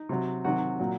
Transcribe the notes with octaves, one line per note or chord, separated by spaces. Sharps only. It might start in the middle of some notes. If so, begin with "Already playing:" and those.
Already playing: D#4
C3 F#3
C3 D#3 F#3 F#4
A#2 F#3